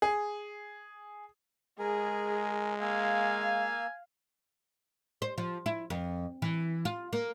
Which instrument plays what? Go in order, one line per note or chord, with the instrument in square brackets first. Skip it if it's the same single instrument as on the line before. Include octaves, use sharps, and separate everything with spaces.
[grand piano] G#4
[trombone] G#3 [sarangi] G#4 [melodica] A#4 G#5
[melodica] A#3 E6 [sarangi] F5 [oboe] G#5
[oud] C5
F3
E4
F2
E3
F4
A#3